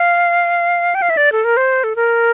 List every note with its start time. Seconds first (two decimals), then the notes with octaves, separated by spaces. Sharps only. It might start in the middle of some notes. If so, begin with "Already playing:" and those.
Already playing: F5
0.95 G5
1.02 F5
1.10 E5
1.17 D5
1.32 A4
1.44 A#4
1.57 C5
1.84 A4
1.96 A#4